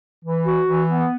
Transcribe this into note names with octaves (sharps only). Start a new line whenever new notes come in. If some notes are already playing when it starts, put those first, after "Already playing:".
E3
F#4
E3
B3